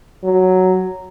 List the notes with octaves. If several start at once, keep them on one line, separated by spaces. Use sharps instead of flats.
F#3